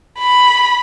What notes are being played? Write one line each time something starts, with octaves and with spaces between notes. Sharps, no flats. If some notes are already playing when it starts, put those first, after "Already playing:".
B5